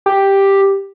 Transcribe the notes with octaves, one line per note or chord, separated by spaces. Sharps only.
G4